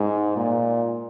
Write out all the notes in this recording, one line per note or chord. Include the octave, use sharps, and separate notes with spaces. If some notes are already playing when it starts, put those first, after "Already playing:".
Already playing: G#2
A#2